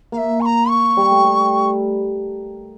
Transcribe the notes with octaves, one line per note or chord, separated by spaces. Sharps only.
A#3 F5
E5
C#6
A#5
C#6
G3
A3
G3